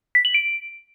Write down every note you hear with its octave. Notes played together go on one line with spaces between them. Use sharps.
B6
F#7
D7